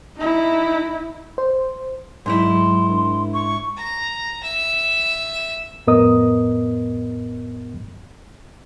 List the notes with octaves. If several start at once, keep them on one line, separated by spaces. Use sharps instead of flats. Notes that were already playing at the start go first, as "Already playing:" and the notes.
D#4 E4
C5
G#2 F#3 D#4 E4 C6
D4 A#4
C#6
A#5
E5
F2 A2 B3 A#4 D#5 D#6